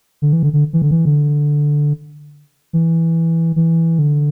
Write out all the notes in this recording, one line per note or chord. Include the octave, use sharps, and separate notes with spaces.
D3
E3
D3
D3
E3
D3
E3
D3
E3
E3
D3